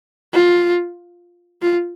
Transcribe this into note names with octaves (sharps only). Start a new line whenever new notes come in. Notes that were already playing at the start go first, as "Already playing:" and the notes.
F4
F4